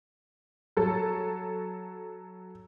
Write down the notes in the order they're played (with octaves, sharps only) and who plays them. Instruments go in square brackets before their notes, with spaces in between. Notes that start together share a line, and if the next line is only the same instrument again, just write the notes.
[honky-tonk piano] F#3 A4